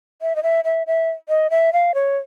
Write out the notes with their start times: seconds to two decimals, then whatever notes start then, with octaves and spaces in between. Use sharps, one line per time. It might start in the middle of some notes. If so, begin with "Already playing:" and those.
0.22 E5
0.36 D#5
0.43 E5
0.65 E5
0.87 E5
1.29 D#5
1.50 E5
1.73 F5
1.94 C#5